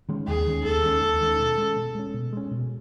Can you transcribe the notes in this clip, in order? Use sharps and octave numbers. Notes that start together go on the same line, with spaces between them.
D#3 G#3 C#4
D#2 G#4
D#3 G#3 C#4
D#2 A4
D#3 G#3 C#4
D#2
D#3 G#3 C#4
B2
G#3 C#4
B2
G#3 C#4
B2
G#3 C#4
B2